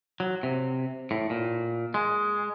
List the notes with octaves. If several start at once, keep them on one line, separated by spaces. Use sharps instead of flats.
F#3
C3
A2
A#2
G#3